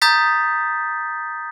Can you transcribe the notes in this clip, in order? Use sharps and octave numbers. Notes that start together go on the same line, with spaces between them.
A#5 D#6 G6 A6 B6